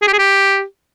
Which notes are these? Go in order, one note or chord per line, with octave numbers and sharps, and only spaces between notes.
G#4
G4
G#4
G4